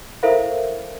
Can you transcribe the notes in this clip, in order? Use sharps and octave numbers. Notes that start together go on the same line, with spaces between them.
E4 A4 A#4 C5 E5 F5